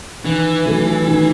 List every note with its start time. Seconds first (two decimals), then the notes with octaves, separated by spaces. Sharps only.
0.25 D#3 E3
0.65 F#3 A3
1.07 D#3